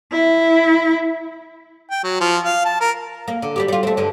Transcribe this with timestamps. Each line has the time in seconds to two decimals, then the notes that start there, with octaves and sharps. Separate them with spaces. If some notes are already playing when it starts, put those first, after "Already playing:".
0.12 E4
1.90 G5
2.04 F#3
2.21 F3
2.45 F5
2.65 A5
2.81 A#4
3.28 A#3
3.42 D3
3.56 G3 B3 G4
3.68 G3 F4
3.83 A3 C4
3.97 G2 D3